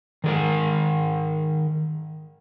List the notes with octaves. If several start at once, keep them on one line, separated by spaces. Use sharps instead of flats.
D#3 G#4 A#4